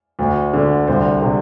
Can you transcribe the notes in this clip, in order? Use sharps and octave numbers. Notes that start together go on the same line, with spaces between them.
D2
D3
C2 C5
C3